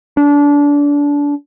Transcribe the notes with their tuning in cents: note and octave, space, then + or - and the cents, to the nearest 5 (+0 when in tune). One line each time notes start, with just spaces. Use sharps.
D4 -25